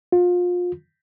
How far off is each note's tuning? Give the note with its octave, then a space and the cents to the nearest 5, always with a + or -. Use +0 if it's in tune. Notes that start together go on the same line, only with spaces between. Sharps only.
F4 +30